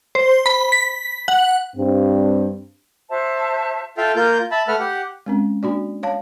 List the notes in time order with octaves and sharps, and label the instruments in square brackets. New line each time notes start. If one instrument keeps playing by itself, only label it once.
[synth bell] C5
B5
B6
F#5
[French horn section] G2 C4
[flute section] F#4 C5 E5 A5
[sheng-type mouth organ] F4 A4 E5 F5 G5
A#3 F4 A#4 G6
E5 A5 B5
A3 B4 E5 F#5 F6
G4 F#5
[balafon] G#3 C4 C#4
A#3 D4 F#4 D5
C#5 F5 A5